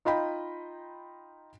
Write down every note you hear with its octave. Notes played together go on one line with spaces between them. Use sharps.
D#4 F4 D#5 G5 B5